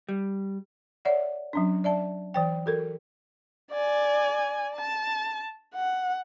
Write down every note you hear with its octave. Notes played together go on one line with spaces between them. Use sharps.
G3
C#5 D5 E5 F#5
F#3 C#4 D4
D5 E5 A5
E3 C5 G5
F#4 A4 A#4
D5 G#5
A5
F#5